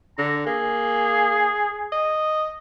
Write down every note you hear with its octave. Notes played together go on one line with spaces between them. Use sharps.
D3 A#5
A#3 G#4
D#5